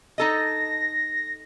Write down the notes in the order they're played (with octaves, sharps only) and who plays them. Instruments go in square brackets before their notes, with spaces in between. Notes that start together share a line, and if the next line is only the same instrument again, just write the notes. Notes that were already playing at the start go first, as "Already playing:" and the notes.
[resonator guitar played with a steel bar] D#4 A4 D#5 [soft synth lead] A#6